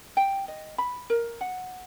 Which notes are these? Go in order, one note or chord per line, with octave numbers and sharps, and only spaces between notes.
G5
D#5
B5
A#4
F#5